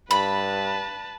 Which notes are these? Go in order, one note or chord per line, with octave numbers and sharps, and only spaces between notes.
G2 B4 A5 B5